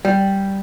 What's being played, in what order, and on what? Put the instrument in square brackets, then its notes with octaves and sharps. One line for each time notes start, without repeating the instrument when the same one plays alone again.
[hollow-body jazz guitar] G3